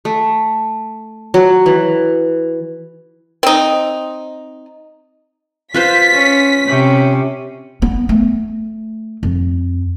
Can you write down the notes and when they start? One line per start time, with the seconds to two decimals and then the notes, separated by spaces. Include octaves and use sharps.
0.05 A3
1.34 F#3
1.66 E3
3.43 C4 D#4
5.74 F4 B4 C5 B6
6.11 C#4
6.67 C3 C#4
7.82 B3
8.09 A3
9.23 F2